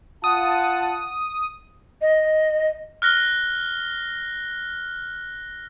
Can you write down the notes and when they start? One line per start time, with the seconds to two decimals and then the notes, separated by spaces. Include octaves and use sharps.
0.24 F4 F#5 A5 D#6
2.02 D#5
3.02 F6 F#6 A#6 G7